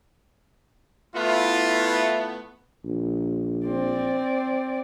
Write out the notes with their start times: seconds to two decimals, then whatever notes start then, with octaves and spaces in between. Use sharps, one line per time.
1.15 A3 B3 E4 F4
2.85 A#1
3.66 C4 D5